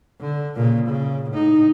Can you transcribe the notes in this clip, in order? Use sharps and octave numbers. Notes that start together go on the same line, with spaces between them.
D3
A#2 C#3
C#3
A2 D#4